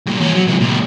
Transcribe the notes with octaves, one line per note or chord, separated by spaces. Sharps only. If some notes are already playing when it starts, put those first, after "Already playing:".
G2 A#2
E2 C#4
F#3
C3 G#3
C#2 A#2